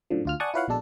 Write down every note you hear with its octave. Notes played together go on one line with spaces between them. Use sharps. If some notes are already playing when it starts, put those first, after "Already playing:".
F#2 A2 D3 F3
D2 F4 F6
D5 F#5 G#5 A5 C#6 D#6
E4 F4 B4 C#5 F5 F#5
A#1 B2 G#3 D4 A4 A5